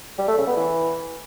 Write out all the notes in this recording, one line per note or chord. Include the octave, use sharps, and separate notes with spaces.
G3
A3
C#3
B3
E3